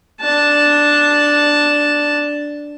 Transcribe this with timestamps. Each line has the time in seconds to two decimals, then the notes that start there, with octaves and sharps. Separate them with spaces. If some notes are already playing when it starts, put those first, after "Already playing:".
0.21 D4 A5